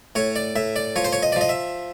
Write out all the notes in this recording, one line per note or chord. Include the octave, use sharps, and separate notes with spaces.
A2 C#5
D5
A2 E5
D5
F3 C#5
C5
C#5
D#5
D5
F3 D#5
E5